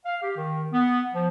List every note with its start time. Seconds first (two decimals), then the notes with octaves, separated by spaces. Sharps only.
0.05 F5
0.22 G4
0.36 D#3
0.72 B3
1.14 F3